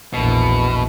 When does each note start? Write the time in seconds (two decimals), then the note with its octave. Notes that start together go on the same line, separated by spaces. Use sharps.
0.14 A#1 E2 B2